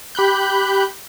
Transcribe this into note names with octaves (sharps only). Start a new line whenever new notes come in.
G4 B5 F#6 G6